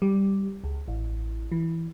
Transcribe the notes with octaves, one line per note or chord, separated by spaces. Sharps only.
G3
C#2
A1
E3